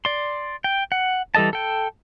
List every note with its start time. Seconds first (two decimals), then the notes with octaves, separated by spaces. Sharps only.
0.05 D5 C6
0.64 G5
0.92 F#5
1.35 E3 G3 A4 D#5 A5
1.53 A4 G5